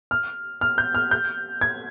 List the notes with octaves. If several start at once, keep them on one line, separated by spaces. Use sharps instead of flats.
F6
F6
G6
F6
G6
G#6